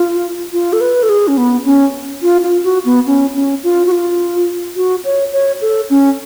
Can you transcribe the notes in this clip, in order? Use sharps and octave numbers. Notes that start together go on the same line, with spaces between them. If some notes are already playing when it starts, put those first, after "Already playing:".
Already playing: F4
F4
A4
B4
A4
G#4
C#4
B3
C#4
F4
F4
F#4
B3
C#4
C#4
F4
F#4
F4
F#4
C#5
C#5
A4
C#4